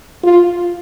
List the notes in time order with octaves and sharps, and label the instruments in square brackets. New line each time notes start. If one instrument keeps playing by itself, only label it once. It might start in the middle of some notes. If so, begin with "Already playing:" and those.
[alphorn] F4